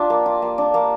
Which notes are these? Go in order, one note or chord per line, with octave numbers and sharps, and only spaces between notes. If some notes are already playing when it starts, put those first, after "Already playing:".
Already playing: D4 F4 G4
A#3
F4
A#3
D4
A#3